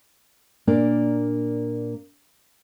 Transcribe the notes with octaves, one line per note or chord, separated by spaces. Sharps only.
A#2 A#3 D4 D5